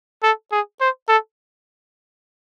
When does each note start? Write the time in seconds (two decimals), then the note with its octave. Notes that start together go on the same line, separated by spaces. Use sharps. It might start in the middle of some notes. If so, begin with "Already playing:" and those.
0.23 A4
0.52 G#4
0.81 C5
1.08 A4